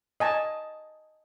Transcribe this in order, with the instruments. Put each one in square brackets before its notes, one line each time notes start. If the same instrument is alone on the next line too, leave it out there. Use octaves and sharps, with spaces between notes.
[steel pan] D#5 G#5 A5